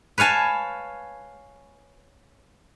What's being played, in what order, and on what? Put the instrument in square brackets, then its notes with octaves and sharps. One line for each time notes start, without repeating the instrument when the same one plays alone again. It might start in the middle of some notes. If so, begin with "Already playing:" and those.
[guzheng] B4 C#5 F5 G#5 A5